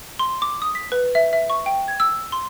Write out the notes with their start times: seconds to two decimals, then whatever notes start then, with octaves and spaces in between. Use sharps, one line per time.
0.19 C6
0.42 D6
0.62 D#6
0.75 B6
0.92 B4
1.15 E5
1.33 E5
1.50 C#6
1.66 G5
1.88 G#6
2.00 E6
2.32 C6